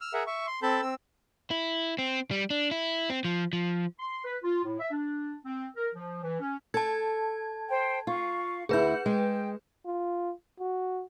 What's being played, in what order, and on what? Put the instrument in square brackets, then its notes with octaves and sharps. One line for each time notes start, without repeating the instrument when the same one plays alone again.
[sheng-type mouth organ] E6 F6
G#4 A#4 E5 F#5
E5 C#6
C6
C4 A4 A5 B5 G6
C4 E6
[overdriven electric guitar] E4
C4
G3
D4
E4
C4
F3
F3
[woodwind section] C6
B4
F4
A2
E5
D4
C4
A#4
F3
E3
C#4
[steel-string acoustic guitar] A4 [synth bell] A5 G#6
[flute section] C5 G5
[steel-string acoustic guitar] F4 [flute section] F5 C#6
[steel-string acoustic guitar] D2 E4 [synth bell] G#4 B4 G6 [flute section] F#5
[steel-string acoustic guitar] G#3 [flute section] G5
[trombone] F4
F#4